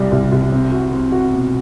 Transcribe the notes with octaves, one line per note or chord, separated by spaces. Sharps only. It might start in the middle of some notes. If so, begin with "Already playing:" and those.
Already playing: C2 G3
C2
C2
C4
F#4
C4
F#4
B2